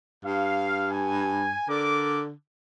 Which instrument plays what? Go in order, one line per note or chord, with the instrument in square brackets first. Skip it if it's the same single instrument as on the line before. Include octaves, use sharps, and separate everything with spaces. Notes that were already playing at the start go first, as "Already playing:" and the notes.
[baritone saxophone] G2 [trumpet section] F5
[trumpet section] G#5
[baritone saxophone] D3 [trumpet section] A#4 D5 D6